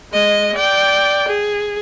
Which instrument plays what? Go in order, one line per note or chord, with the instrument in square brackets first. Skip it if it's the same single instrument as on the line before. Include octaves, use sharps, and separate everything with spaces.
[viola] G#3 D#5
D5 G5
G#4